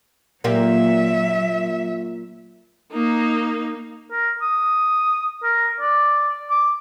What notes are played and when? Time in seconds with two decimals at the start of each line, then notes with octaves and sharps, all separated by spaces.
0.44 A#2 F#3 A#3 G4 E5
2.93 A#3 D#4
4.11 A#4
4.42 D#6
5.43 A#4
5.80 D5
6.50 D6